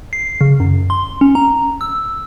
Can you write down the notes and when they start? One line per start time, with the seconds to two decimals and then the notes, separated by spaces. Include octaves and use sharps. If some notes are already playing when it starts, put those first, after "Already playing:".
0.13 C7
0.41 C#3
0.60 F#2
0.90 C6
1.21 C#4
1.35 A#5
1.81 E6